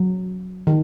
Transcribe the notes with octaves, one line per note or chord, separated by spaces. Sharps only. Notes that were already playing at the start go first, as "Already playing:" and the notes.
Already playing: F#3
D#3